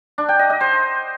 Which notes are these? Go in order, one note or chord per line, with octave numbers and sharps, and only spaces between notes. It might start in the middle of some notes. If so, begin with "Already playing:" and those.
D4
G5
D#5
D#5
C5